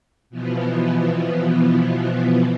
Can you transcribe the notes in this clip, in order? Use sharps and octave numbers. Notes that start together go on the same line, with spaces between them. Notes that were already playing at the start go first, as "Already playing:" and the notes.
B2 E3 F3 B3